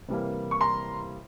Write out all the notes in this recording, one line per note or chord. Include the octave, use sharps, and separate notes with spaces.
C3 E3 G3 A#3
C#6
A#5 C6